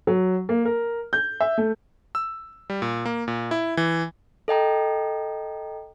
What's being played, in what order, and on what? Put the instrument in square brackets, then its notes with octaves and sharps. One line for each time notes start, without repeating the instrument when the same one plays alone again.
[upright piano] F#3
A#3
A#4
G6
E5
A3
[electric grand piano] E6
G3
A#2
A#3
A#2
E4
E3
[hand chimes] A4 D#5 G5 A#5